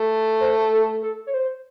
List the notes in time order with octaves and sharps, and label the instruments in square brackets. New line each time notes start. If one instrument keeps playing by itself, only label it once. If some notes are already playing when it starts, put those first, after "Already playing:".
Already playing: [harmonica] A3
[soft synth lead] C5
A4
A4
C#5
C5